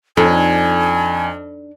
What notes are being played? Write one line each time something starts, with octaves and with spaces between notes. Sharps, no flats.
F2 D4 D#4 A4 G#5